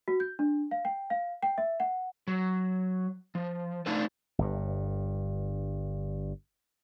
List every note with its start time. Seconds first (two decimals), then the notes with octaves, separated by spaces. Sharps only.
0.08 F#4
0.20 G6
0.39 D4
0.71 F5
0.85 G5
1.10 F5
1.43 G5
1.58 E5
1.80 F#5
2.28 F#3
3.35 F3
3.86 A3 D4 D#4 F4 A4 B4
4.38 G1 G2